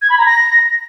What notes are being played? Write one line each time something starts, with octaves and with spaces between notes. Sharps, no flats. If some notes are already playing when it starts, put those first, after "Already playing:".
G#6
B5
A#5
A#6